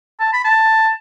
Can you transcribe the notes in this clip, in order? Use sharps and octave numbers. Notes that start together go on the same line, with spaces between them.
A5
B5
A5